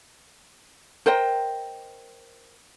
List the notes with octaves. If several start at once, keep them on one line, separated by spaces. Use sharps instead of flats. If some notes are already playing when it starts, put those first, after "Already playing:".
A#4 C5 D#5 G5